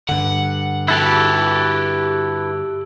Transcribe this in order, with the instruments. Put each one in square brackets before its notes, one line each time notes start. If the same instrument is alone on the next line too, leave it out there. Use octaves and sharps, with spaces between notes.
[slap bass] G2 D3 [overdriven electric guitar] F#5
[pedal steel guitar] E4 A4 B4 [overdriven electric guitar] F#4 G4